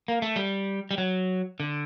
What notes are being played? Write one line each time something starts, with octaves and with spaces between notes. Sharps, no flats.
A#3
A3
G3
G3
F#3
D3